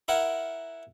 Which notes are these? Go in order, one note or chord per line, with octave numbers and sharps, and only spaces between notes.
E4 A#4 F#5